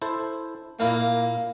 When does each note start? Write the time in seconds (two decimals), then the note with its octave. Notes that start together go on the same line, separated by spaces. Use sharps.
0.02 E4 A4 C5
0.80 A#2 A#3 E4 F5